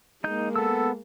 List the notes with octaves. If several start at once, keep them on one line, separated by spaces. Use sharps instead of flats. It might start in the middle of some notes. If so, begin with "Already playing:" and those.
G#3 A#3 D#4 G6
B3 A4 E6